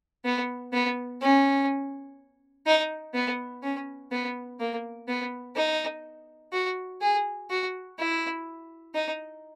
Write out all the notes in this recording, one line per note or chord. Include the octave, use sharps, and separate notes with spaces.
B3
B3
C#4
D#4
B3
C#4
B3
A#3
B3
D#4
F#4
G#4
F#4
E4
D#4